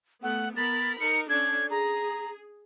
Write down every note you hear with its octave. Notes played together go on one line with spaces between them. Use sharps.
A3 B3 F#5
B3 A#4 B5 A6
D#4 A#4 C#7
C#4 D4 A4 G#6
G#4 A#5